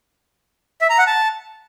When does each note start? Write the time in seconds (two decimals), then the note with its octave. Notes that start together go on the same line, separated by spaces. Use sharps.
0.81 E5
0.90 A#5
0.98 F#5
1.07 A5